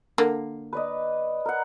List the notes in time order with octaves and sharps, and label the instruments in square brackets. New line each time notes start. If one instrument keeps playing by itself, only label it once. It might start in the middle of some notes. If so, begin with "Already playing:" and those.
[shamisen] D3 A#3
[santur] B4 D5 D#5
A#4 F#5